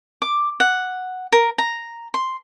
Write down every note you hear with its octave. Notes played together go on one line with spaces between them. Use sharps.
D6
F#5
A#4
A#5
C6